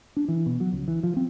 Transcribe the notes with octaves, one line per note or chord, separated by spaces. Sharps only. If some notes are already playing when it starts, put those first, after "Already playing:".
D4
E3
B2
F#3
C#2
E3
F3
C4